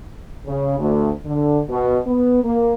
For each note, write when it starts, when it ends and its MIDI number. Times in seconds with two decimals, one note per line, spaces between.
0.46 0.77 49
0.79 1.10 38
1.26 1.59 50
1.69 1.97 47
2.06 2.40 59
2.44 2.73 58